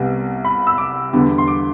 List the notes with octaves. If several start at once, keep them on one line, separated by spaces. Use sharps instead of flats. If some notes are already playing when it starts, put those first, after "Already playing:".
Already playing: C2 C3 G3 B3
B5
E6
D6
E2 D3 G3 B3
C6
D6